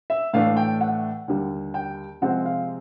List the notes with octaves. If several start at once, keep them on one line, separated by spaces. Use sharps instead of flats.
E5
A2 E3 A3 D4 F5
G5
F#5
D#2 D3 G3
G5
C3 F3 G#3 C4 F#5
F5